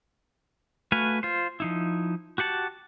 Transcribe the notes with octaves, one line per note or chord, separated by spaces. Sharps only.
A3 F#4 B4 F5 G#5
F4 C5
F3 D#4 E4
F#4 G4 F#5 A5